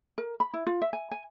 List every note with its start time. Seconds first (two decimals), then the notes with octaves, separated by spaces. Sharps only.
0.18 A#4
0.40 B5
0.54 E4
0.67 F4
0.82 E5
0.93 G#5
1.11 G#5